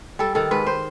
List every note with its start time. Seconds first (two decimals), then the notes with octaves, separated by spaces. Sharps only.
0.19 G3 A4
0.35 D#3 A4
0.51 G#2 B4
0.67 C5